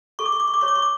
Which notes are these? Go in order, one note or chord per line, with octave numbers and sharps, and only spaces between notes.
A4 C#6
D6
C#6
D6
C#6
D6
C#5 C#6
D6
C#6
D6